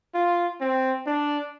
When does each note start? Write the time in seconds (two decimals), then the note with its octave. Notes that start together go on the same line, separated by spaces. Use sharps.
0.14 F4
0.61 C4
1.06 D4